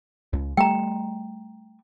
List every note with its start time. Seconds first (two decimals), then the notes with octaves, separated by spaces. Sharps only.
0.33 C#2
0.57 G3 A3 G5 A#5